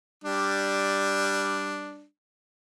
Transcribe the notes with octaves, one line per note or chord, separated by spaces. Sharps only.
G3 D4